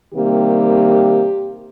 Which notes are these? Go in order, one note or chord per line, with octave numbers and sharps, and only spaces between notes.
C3 D#3 G3 A#3 G4